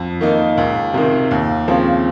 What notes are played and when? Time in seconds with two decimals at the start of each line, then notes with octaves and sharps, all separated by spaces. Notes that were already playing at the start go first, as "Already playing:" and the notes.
Already playing: F2
0.21 D#3 A#3 D#4
0.57 C#2
0.94 C3 D#3
1.31 D#2
1.68 C#3 F3 C4